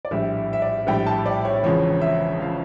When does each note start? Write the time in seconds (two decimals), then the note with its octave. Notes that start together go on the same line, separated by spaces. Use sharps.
0.05 D5
0.11 A#1 A2 G3 E5
0.37 E5
0.53 E5
0.62 D5
0.87 A#1 A2 G3 G5
1.06 A5
1.26 D5
1.45 C#5
1.63 E1 E2 C#3 F3 C#5
2.01 E5
2.40 C#3 F3 F5